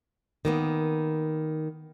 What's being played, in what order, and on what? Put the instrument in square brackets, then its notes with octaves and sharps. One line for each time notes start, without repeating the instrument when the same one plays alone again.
[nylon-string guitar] D#3 A#3 B3